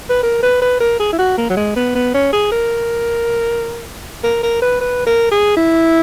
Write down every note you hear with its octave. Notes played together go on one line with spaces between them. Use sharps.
B4
A#4
B4
B4
A#4
G#4
E4
F#4
A#3
F#3
G#3
B3
B3
C#4
G#4
A#4
A#4
A#4
B4
B4
A#4
G#4
E4